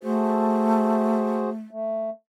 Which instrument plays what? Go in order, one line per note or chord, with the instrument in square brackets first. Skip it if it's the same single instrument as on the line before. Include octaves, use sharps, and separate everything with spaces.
[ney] A3 [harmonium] F#4 G#4 C5
[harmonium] A3